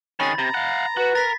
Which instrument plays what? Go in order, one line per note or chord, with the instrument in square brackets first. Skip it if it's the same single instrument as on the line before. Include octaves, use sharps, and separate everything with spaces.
[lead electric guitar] D#3 G#4 [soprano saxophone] C#4 [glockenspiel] B5 A6
[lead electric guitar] C3 [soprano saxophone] A#5
[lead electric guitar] F5 F#5
[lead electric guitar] F#4 [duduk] B4
[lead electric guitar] A#4 [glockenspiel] A6 B6